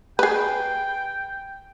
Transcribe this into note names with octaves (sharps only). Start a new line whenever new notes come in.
G#4 B4 G5